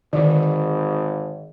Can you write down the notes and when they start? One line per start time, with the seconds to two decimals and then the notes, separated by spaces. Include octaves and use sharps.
0.13 G#1 D3 D#3